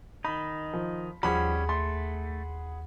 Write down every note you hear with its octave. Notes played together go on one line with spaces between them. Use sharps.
D#3 D#4 B5
F3
D#2 F3 G3 C#4 G#4 F#5 B5
A3 C6